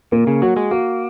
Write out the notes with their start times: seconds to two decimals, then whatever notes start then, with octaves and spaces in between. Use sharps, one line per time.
0.12 A#2 A#3
0.27 C#3
0.42 F#3 F#4
0.57 G#3
0.71 A#3 F#4